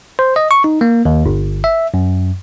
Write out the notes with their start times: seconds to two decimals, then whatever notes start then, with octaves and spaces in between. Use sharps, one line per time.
0.19 C5
0.36 D#5
0.51 C#6
0.64 D#4
0.81 A#3
1.05 D#2
1.26 G1
1.64 E5
1.94 F#2